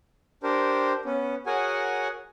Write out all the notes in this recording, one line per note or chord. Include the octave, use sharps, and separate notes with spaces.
D4 G4 A#4 C5
B3 C#4
F#4 G#4 A#4 C#5 F#5 G#5